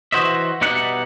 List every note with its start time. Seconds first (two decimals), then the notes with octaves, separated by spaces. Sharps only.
0.12 E3 F#4 C5 D#5 E5
0.61 B2 G3 D#4 E5 F#5